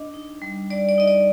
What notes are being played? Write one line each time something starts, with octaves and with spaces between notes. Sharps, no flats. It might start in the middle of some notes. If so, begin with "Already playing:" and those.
Already playing: D4 D#5
D#4
G3
G3 D5
D5
D#4 D#5
D5